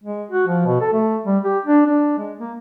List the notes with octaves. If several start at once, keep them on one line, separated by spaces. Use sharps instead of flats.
G#3
F#4
F3
B2
A4
A3
G3
G4
D4
D4
G#3
A#3